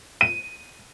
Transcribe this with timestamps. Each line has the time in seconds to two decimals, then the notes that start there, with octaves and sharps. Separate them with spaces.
0.21 D#7